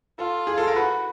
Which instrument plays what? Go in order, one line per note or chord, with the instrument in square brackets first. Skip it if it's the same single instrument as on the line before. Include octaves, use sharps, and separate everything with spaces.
[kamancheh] F4 [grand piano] A4
[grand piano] G#4
A4
A#4
[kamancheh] F#4 [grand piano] B4